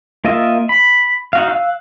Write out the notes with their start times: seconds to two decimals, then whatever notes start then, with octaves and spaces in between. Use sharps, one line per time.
0.24 A#3 F4 A#4 D#5 E5
0.69 B5
1.33 D#4 F#4 F5
1.48 F5 E6 F#6